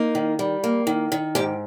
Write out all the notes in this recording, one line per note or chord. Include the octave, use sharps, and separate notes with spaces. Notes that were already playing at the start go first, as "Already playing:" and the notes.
Already playing: A#3 D#4
D#3
G3
A#3
D#3
D#3
G#2 G4